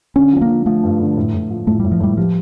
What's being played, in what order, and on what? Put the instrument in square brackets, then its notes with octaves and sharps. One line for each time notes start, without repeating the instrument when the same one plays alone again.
[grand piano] D3 [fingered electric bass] C#4
[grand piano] F3 [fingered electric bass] C#4
[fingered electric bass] A#3
[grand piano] F3
[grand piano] F3 [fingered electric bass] A3
[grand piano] G2
D3
A2
A2
F3
[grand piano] A2 [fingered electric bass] A3
[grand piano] A2 [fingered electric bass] G3
[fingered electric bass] F3
[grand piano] A2 [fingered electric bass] G3
[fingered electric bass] F3 [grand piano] G4